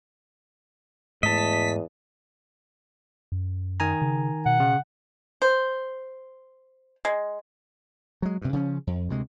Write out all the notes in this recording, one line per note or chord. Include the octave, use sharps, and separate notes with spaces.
E2 G#2 A3 D#5 A5 B6
F#2
D#3 G#5 A#5
C#3
B2 F#5
C#3
C5
G#3
F#3 G#3
G2 C3
C#3 F3 C#4
F2
D2 C3 G#3